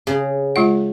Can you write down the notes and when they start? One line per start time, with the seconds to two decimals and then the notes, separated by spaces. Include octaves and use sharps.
0.07 C#3
0.56 G#3 F4 F#5